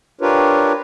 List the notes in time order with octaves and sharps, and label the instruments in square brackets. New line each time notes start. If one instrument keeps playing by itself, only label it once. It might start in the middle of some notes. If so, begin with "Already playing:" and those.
[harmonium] D4 F4 G4 A#4 B4 C#5